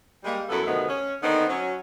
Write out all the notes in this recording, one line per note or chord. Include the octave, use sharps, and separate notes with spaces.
G3 G#3 A#3
F#2 C#3 B3 E4 A4
D2 G2 C3 D#3 A3 B3
C#4
D3 D#3 B3 C4 D#4
F#3 C#4